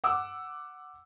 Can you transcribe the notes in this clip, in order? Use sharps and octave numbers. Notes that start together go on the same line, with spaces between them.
F#5 D6 E6